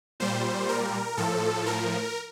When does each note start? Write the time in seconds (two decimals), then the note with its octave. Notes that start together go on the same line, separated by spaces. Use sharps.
0.20 A#2 G3 C5
0.69 A#4
1.17 A2 F3 A4
1.66 A#4